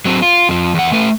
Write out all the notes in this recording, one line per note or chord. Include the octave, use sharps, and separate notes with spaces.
F#3 C4
F4
F2 F3
E2 F#5
A3 B4